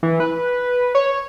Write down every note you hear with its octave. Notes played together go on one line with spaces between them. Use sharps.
E3
B4
C#5